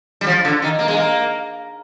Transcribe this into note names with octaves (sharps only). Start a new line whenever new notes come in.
G3
F3
D3
D#3
A#3
G#3
A#3